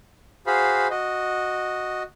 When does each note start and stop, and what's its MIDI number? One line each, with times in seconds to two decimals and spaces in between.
0.47 0.87 66
0.47 0.87 68
0.47 0.87 72
0.47 0.87 77
0.47 0.87 83
0.90 2.03 66
0.90 2.03 75